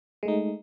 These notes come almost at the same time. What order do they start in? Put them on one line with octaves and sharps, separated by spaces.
G#3 A3 D#4